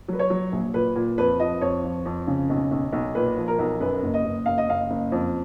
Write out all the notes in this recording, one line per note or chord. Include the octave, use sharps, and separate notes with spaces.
F#3 B4
C#5
F#3
A#1
A#2 B4
A#2
F2 B4
F3 D#5
F2 C#5
F3
F2
C#3
B1
B1
B1
A#2 B4
F3
A#4
B1
F#2 B4
F#1
D#5
F#1
F#1 F5
D#5
F#1 F5
F#1
F2